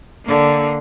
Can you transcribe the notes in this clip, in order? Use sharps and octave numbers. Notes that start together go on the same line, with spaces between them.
D3 A#3